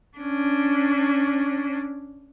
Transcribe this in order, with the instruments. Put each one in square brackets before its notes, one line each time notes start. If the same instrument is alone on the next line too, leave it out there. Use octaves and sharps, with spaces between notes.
[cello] C#4 D4